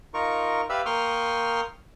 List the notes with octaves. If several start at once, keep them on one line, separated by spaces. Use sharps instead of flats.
D#4 F4 A#4 C#6
G4 B4 D5 E5 F5 E6
A#3 G5 C6 C#6 D#6 F6